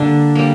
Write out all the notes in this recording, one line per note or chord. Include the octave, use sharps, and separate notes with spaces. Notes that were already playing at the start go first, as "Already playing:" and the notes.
Already playing: D3 G3 A#3 D4
G3 A#3